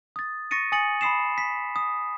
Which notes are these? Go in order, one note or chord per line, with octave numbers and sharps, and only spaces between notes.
D#6 A6
C#6 A6 A#6 C#7 D#7
G#5 D#6 A6 C#7 F#7
B5 C6 D#6 C7 E7
B6
D#6